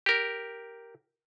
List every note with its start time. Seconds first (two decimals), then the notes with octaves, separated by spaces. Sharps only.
0.06 G4 A#4